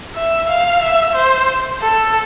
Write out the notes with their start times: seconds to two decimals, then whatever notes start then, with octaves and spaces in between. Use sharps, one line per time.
0.15 E5
0.49 F5
0.82 E5
1.15 C5
1.81 A4